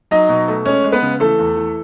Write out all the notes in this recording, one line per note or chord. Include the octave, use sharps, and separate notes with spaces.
F#3 D#4 D#5
B2
A3
G#3 C#4 C#5
G#3
B3 B4
C#3
E3 A3 A4
E2
E3